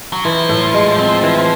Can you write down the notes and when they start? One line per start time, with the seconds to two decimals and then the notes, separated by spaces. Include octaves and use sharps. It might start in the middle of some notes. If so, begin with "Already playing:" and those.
0.13 F#3
0.24 E3 F3
0.49 A2
0.74 G#3
0.99 C4
1.23 E3